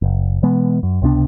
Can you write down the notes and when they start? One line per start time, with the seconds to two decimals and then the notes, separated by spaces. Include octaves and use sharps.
0.02 F#1
0.43 B2 E3 G#3 B3
0.83 F#2
1.02 C#2 C3 B3 D4